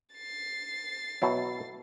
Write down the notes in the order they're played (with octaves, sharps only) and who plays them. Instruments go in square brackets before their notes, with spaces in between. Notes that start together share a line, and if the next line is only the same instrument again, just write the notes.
[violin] A6 C7
[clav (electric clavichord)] B2 F#3 E4